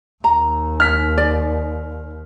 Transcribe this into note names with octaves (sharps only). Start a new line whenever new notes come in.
D#2 A#5
F6 B6
D5